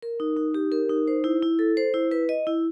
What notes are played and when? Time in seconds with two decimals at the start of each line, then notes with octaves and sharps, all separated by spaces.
0.02 A#4
0.20 D#4
0.37 D#4
0.54 G4
0.72 A#4
0.89 D#4
1.08 C5
1.24 E4
1.43 E4
1.59 A4
1.77 C5
1.94 E4
2.11 B4
2.29 D#5
2.47 E4